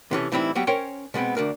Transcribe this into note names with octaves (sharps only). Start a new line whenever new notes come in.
C3 E3 C#4 A4
A2 E3 G3 C4 D#4 E4
F#3 G3 B3 G4
C#4 A#4 C5 C#5 G5
B2 G#3 B3 C4
D2 D4 A#4